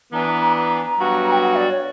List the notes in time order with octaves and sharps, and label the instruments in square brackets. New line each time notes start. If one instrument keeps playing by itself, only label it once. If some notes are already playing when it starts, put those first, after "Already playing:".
[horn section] E3 B3 D4 [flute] A#5
[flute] A#5
A#5
A#5
[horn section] G2 F#3 B3 F#4
[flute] G5
F#5
D5
C#5